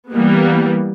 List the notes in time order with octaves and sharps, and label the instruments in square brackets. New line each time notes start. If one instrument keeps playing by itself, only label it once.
[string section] E3 G3 A#3 B3